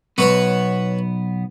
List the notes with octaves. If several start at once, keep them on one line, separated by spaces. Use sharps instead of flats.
B1 B3 F#4 B4 C#5